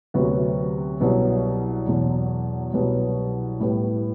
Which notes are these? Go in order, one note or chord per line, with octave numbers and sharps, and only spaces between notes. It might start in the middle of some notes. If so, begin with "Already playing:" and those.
D2 C3 F#3 B3 F#4
C2 B2 F#3 B3
E2 B2 F#3
C2 B2 F#3 B3
A2 G3 B3